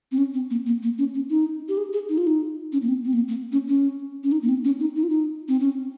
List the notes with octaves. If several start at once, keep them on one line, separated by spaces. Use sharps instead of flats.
C4
C#4
C4
A#3
A#3
A#3
C#4
C#4
D#4
G4
G#4
G#4
D#4
F4
D#4
C#4
A#3
C4
C4
A#3
A#3
C#4
C#4
C#4
D#4
A#3
C4
C#4
D#4
D#4
F4
D#4
C4
C#4